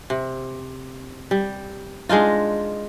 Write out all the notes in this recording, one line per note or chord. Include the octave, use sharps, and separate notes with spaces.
C3
G3
G#3 D4 D#4 F4